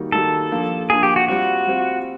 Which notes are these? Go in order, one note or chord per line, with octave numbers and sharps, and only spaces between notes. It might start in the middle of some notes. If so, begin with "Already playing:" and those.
Already playing: D#3 G3 A#3 D#4 F#4
D#3 G3 A#3 D#4 F#4 A4
F3 A#3 D4
F3 A#3 D4 G#4
G4
F#4
G3 C4 F4 F#4
G3 C4 F4